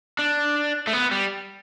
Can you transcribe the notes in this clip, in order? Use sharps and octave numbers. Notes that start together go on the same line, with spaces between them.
D4
A3
B3
G3